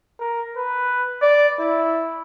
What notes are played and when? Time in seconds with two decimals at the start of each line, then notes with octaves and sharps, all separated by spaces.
0.20 A#4
0.57 B4
1.22 D5
1.60 E4